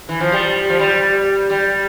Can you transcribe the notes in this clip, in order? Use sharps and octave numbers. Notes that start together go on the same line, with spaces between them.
E3
F3
G3
F3
G3
G3